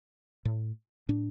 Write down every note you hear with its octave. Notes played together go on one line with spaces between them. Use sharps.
A2
A2 D4